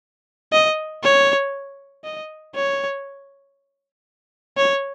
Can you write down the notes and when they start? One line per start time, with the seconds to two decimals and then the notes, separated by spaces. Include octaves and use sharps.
0.53 D#5
1.03 C#5
2.04 D#5
2.55 C#5
4.57 C#5